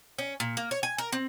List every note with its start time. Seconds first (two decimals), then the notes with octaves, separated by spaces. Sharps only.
0.18 C#4
0.40 A#2
0.57 A#3
0.71 C#5
0.83 G#5
0.98 A#4
1.12 C4